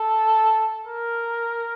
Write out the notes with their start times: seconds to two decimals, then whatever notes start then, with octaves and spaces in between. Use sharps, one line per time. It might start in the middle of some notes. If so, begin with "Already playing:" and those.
Already playing: A4
0.87 A#4